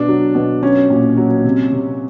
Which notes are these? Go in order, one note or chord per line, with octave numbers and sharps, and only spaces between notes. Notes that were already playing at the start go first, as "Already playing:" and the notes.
Already playing: B2 D4
F#3
B2
F#3 C#4
A#2
F#3
C3
C3